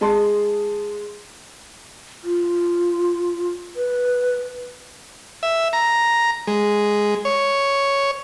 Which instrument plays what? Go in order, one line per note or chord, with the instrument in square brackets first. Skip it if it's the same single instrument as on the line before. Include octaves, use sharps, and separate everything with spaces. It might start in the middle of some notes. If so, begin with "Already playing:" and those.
[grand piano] G#3 A5 C6
[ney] F4
B4
[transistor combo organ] E5
A#5
G#3
C#5